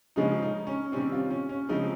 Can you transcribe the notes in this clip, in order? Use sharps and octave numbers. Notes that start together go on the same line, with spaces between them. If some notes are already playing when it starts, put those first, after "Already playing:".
C#3 F3 G#3 C#4 D#4
D#4
C#4
C3 D#3 G3 C4 C#4
F4
C#4
C#4
C#3 F3 G#3 C4 D#4